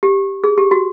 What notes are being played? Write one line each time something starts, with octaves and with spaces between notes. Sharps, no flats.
G4
G#4
G4
F#4